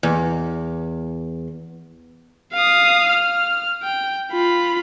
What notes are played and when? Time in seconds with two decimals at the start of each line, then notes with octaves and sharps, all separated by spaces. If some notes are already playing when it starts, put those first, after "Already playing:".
0.03 E2
2.53 F5 D#6
3.10 F6
3.83 G5
4.32 F4 B5